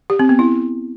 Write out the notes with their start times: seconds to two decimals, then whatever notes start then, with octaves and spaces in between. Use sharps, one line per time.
0.10 G4
0.19 C4
0.29 B3
0.39 E4